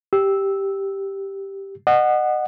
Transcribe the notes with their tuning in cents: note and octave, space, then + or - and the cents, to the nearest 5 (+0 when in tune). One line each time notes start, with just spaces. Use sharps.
G4 +0 E6 -5
D#5 -35 F#5 +0